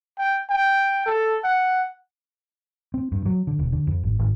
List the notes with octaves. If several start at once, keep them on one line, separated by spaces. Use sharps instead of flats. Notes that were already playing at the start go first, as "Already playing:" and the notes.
G5
G5
A4
F#5
C4
G2
F#3
D3
E1
D3
F2
G#1
G#1